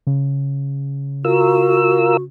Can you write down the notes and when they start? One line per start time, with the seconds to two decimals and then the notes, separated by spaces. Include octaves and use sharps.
0.07 C#3
1.25 F4 F#4 A#4 E6